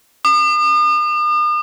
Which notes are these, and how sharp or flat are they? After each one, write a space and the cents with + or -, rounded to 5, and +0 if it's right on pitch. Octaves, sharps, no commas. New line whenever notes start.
D#6 -45